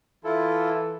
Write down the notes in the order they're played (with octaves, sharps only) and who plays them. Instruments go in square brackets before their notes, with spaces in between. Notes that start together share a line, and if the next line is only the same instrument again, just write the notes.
[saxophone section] E3 A4 [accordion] E4 F4